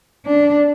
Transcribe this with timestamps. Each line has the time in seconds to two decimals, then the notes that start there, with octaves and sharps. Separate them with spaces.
0.25 D4